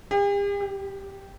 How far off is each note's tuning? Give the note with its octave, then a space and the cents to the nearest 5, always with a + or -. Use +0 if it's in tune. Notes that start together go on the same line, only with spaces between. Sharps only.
G4 +45
G4 +0